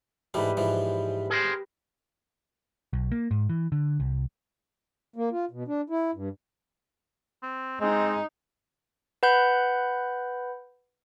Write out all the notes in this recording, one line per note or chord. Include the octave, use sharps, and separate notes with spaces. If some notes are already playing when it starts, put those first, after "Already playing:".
G#2 E3 G3 A3 B4
G#2 E3 F3
G#4 A#4 C5
B1
A#3
G#2
E3
D3
C2
A#3
F4
B2
D4
E4
G2
C4
G#3 C4 D#4
B4 F#5 B5 G6